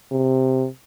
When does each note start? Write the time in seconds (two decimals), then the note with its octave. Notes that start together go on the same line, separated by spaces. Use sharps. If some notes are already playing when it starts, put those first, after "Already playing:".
0.12 C3